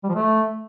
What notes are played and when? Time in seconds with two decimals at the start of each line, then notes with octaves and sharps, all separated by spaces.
0.04 G3
0.09 F3
0.15 A3